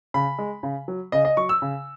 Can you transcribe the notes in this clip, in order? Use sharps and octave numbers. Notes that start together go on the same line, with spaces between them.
C#3 B5
G#3
C#3
F#3
C#3 D#5
D#5
F#3 C#6
E6
C#3